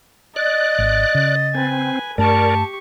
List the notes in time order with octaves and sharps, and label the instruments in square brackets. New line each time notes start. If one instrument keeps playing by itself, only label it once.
[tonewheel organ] D5 F#6 [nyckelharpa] D#5 [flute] A6
[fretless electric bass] G#1
C#3
[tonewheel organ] C4 [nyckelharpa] B4 G#5
[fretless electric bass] G2 A3 [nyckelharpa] G4 C#6 [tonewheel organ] A#4 D5 [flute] A5